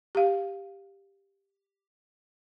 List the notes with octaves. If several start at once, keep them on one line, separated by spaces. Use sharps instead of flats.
G4 F5